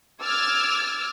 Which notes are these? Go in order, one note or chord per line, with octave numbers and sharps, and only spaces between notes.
D6 E6 F6 G#6 A6